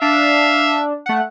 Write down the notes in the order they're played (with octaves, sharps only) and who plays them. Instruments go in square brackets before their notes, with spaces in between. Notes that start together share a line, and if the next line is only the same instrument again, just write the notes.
[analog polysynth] D4 [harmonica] E5 F5
[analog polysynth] A3 F#5